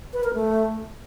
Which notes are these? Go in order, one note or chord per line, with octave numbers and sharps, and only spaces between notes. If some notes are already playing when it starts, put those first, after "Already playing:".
B4
A#4
A3